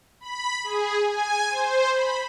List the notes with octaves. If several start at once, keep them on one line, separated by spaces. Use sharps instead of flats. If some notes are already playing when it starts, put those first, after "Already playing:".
B5
G#4
G#5
C5
B5